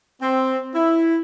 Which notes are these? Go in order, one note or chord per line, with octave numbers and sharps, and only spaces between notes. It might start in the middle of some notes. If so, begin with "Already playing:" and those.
C4
E4